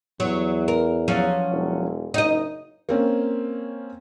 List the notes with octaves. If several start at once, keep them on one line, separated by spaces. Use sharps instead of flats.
E2 F#3
A#4
F3 F#3 C#4
E1
F#1 D#4 D#5
A#3 C4 C#4